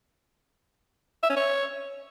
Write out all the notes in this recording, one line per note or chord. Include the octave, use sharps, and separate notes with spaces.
E5
C#4
C#5